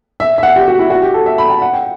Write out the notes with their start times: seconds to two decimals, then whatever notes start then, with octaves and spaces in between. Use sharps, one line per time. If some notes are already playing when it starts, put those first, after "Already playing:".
0.20 E5
0.38 E5
0.43 F#5
0.56 G4
0.68 F#4
0.79 E4
0.90 F#4
1.02 G4
1.14 A4
1.26 E5
1.38 B5
1.50 A5
1.62 F#5
1.73 G5